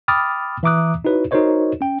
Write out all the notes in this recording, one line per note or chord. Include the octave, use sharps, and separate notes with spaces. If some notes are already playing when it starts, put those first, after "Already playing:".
G5 B5 D6 D#6 F6 A6
E3 E5 A#5 D6 D#6 F#6
D#4 E4 F#4 B4 C#5
D#4 F#4 A#4 C5 C#5 D#5
C#4 G5